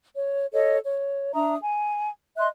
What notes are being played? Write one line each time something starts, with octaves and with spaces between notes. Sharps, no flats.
C#5
A4 C#5 D#5
C#5
D4 E5 A#5 D#6
G#5
D#5 E5 C6 F#6